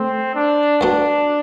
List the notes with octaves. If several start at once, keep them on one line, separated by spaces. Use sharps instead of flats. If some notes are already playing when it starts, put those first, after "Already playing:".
Already playing: A3 C4
D4
G2 F#3 B3 D4